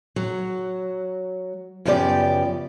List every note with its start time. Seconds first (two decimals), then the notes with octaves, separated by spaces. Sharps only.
0.16 F#3
1.85 F#2 C#3 F3 B3 G4 D5